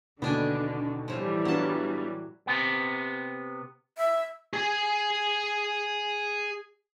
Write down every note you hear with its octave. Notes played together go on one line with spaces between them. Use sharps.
D#2 B2 D3 D#3 B3 D4 G#5
A2 E3 F3 G3
F#3 B3 D4 F4 A5
C3 B3
E5
G#4 G#5